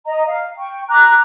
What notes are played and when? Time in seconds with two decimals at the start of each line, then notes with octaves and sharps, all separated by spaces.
0.06 D#5 A#5
0.27 F5
0.58 G5 C#6
0.89 A#5 D6 F#6